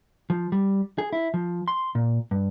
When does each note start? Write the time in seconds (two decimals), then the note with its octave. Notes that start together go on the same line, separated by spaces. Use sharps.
0.30 F3
0.52 G3
0.98 G#4
1.13 E4
1.34 F3
1.68 C6
1.95 A#2
2.31 G2